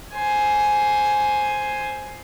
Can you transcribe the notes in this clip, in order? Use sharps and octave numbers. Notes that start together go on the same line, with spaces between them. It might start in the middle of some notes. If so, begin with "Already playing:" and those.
C5 G#5